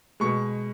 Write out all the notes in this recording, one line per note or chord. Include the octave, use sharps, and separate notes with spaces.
B2 G#3 C#6